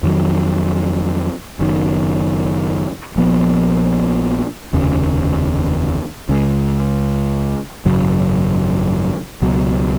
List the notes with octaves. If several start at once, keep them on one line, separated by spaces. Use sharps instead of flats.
F2 D#3 F#3
F#1 F#2 D#3
A#1 A#2 F3 B3
F1 D#2 C#3
C#2 C#3 G#3
G#1 F#2 C#3 F#3
C#2 B2 F#3